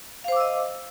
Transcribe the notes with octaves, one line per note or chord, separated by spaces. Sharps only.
C5 D#5 F5 D6 E6